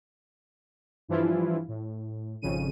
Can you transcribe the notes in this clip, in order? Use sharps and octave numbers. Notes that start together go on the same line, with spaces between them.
G2 E3 F3 E4 F4
A2
G#1 F2 C#3 D#7